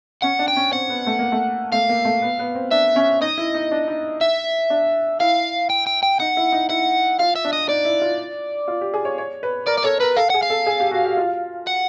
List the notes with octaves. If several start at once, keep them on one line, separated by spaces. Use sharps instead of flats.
C#4 F#5
D4
G5
C#4
C4 F#5
B3
A3
A#3
A3
A3 F5
A#3
A3
B3
B3
C4
D4 E5
C#4
D#4 D#5
E4
D#4
D4
D#4
E5
D4
E4 F5
G5
G5
G5
D#4 F#5
E4
D#4
E4 F#5
F4 F5
E5
D4
D#5
D#4 D5
E4
F4
F4
G4
G#4
C#5
C#5
B4
A#4 D5
D5
A4 C#5
A#4 B4
A4 F5
G#4 F#5
F5
A4
G#4
G4
F#4
G4
F4
F#5